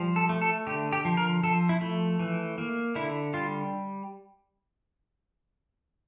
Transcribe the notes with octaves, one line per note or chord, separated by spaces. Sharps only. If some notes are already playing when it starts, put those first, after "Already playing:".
Already playing: F3 G3
A4
A3
A4
D3 G4
G4
F3
A#4
F3 A4
E4
A3
E3
A#3
D3 E4
G3 F4